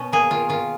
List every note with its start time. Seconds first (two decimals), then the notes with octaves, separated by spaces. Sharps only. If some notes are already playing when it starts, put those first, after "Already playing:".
Already playing: B2 C#4
0.12 A#3 G#4
0.31 D#3 F4
0.49 D#3 F4